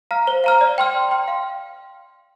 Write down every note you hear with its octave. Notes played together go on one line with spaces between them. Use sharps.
F5 A#5 F6
C5
F5 A#5 F6
D5
G5 C6 F6
D5
G5 C6 F6
F5